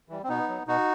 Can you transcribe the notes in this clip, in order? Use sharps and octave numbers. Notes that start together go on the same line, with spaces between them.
E3 G3
C4
B2 B3 D#4
F#3
B2 D#4 F#4